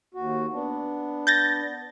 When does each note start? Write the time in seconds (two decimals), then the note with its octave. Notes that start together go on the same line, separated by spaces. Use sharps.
0.14 D#2 F#4
0.53 B3 D4
1.27 G6 A6 A#6